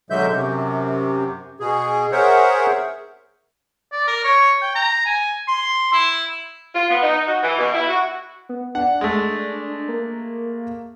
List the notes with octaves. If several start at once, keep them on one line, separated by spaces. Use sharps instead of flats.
B2 D3 F#3 G#3 E5 G6
F#2 C3
B2 G#4
G#4 A#4 C5 C#5 E5 F#5
D5
A#4
C#5
G5
A#5
G#5
C6
E4
F4
B3
D#4
F#4
E3
B2
E4
F#4
B3
D4 F#5
G#3 A3
A#3